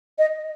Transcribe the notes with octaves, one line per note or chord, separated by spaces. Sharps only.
D#5